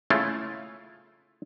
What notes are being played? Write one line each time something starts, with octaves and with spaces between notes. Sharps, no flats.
C#3 A3 E4 F4